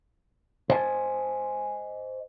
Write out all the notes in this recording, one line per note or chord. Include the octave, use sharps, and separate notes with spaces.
C5 D#5 G#5 A5